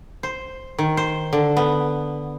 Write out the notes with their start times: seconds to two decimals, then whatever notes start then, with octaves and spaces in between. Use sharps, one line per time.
0.23 C5
0.78 D#3
0.97 C5
1.33 D3
1.57 B3